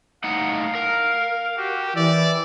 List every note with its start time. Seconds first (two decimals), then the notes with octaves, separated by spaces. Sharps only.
0.24 A2 D#4 F5 F#5
0.75 A#4
1.58 F#4 G4
1.96 E3 D5 E6